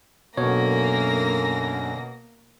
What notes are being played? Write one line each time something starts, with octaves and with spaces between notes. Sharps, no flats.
F#2 B2 D3 A#3 C#5 A#6